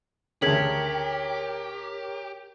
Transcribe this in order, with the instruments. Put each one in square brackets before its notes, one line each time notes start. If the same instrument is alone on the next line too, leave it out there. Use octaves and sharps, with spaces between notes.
[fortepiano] D2 C#3 [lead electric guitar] G4 [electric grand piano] A#4 C#5 [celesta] G#6 B6 F#7